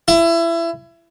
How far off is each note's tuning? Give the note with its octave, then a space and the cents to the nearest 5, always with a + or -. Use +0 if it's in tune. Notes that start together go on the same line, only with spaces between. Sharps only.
E4 +25